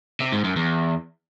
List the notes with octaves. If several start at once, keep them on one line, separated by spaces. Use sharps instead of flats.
C3
G#2
F#2
E2